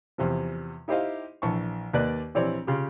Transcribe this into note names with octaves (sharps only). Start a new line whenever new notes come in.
E2 C3 F3
D#4 E4 G4 C5 D#5 F5
A#1 E3 A5 C#6
D#2 A#3 B4 D5 F#6
A#1 E3 C4 G4 C#5 D5
C#3 F4 G4